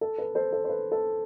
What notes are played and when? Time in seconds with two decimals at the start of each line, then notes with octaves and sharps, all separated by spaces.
0.01 A4
0.18 B4
0.35 A4 C5
0.52 A4
0.64 C5
0.69 B4
0.92 A4